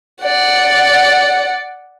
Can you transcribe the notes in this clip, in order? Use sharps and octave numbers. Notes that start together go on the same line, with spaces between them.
D5 F#5